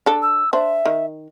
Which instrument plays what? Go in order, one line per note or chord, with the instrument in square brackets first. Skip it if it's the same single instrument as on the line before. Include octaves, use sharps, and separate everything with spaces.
[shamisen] D4 A4
[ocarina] E6
[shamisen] D4 C5 [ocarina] E5
[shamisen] D#3